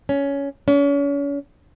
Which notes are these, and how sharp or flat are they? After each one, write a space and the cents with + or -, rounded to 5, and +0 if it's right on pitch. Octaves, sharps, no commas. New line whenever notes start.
C#4 +15
C#4 +35